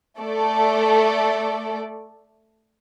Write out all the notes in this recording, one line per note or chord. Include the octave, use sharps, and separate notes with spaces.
A3 A4 D5